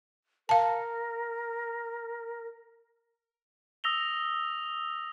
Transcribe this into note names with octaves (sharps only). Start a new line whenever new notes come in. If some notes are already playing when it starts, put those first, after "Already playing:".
A#4 F5 A5
D#6 E6 A#6 F7 G7